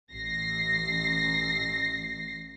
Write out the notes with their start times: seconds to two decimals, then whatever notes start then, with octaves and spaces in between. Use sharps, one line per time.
0.11 A1 A#6 C7